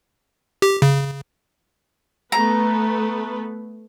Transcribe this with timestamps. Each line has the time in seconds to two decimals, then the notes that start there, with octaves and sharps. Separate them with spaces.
0.62 G4
0.82 C#3
2.32 A3 B3 B4 A#5